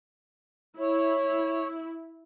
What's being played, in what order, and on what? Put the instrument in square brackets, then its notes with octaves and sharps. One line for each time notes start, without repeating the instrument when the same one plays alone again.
[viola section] E4 [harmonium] C#5